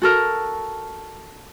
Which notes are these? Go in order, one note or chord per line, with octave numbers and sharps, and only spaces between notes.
F#4 A4 A#4